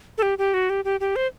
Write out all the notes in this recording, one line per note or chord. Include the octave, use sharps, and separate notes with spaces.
A4
G4
G4
F#4
G4
G4
G4
C5